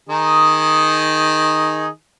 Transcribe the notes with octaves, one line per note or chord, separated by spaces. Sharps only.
D#3 D#4 G#4